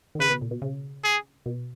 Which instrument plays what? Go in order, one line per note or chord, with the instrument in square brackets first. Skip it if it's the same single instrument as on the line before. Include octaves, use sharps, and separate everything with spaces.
[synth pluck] D#3
[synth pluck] C#3 [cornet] B4
[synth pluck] B2
A#2
B2
C#3
[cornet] G#4
[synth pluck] B2